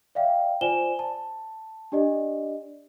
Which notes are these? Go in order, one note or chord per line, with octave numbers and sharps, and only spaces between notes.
D5 E5 F5 G5
F4 C5 D5 G#5 E7 G7
A5
D4 G4 D5 D#5